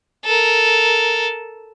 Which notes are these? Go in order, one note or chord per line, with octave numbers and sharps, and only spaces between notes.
A4 A#4